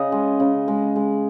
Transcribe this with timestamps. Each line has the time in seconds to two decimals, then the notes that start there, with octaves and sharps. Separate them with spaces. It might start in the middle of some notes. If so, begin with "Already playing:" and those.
Already playing: C#3 D#5
0.12 G#3
0.40 C#3
0.68 G#3
0.96 G#3